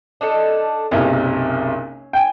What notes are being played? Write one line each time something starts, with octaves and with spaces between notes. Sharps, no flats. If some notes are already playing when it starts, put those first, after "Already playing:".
D4 D#4 A4
F#1 B1 C3 C#4
G5 G#5